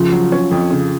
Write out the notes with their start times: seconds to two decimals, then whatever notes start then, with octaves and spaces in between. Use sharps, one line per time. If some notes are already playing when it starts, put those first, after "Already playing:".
Already playing: C#3 F3
0.12 F#3
0.32 C#4
0.51 F2
0.70 C#3